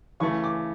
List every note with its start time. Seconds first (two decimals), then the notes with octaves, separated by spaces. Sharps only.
0.20 C#3 E3 A3 C#6
0.44 D6